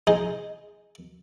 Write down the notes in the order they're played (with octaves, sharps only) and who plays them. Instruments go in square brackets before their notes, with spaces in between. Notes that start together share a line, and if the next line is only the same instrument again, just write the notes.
[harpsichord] D#4 G#4 C5 D#5